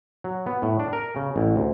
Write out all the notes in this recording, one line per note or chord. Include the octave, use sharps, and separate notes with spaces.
F#3
B3
A2
D4
A#4
C#3
A1
D2